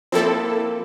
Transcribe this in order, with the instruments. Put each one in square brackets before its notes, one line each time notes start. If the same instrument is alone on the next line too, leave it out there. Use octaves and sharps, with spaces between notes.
[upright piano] F3 A#3 [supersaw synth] C4 E4 A4